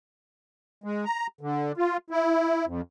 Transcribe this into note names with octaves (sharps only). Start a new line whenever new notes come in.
G#3
A#5
D3
F4
E4
F2